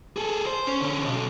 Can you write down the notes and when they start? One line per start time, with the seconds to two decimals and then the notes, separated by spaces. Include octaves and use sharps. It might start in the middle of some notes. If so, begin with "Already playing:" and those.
0.16 G#4 A4
0.47 C5
0.67 C#4
0.81 D3 C#4
1.05 B1